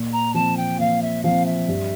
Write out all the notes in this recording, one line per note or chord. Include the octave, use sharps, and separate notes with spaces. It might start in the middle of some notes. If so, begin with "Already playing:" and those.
Already playing: A#2
A#5
F3 C4 A5
G5
A#2 F5
E5
F3 C4 F5
E5
G2